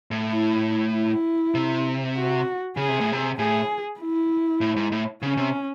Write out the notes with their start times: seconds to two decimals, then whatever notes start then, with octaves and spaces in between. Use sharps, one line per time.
0.11 A2
0.32 E4
0.93 E4
1.55 C3
2.16 F#4
2.77 C#3 G#4
2.89 C3
3.00 A2
3.12 C3
3.38 A2 G#4
4.00 E4
4.61 A2
4.76 G#2
4.92 A2
5.22 C#3 C#4
5.37 C3